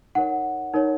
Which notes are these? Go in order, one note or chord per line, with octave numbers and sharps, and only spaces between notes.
D#4 A#4 C#5 F#5
D#4 A#4 C#5